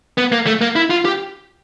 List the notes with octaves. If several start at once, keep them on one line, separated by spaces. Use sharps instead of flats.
B3
A#3
A3
A#3
E4
F4
G4